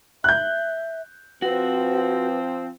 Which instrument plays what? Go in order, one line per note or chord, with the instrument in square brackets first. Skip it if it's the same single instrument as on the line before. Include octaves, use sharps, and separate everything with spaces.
[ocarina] E5 [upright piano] F#6 G6
[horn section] F3 C4 [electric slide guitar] F#4 [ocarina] B4